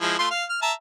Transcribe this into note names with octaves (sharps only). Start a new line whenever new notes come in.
F3 G#3 E4
A3 F4 C6
F5
F6
E5 A5 A#5